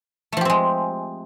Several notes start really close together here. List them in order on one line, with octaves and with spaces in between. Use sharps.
A3 F3 G4 C4 G#3